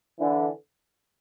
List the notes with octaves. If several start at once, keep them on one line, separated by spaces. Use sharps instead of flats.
D3 E3